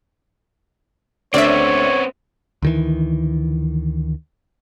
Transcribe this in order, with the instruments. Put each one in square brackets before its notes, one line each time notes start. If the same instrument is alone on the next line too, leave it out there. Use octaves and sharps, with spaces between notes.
[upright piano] D2 [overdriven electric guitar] B3 C4 [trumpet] C#5 [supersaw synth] D5 E5
[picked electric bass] D2 D#3 E3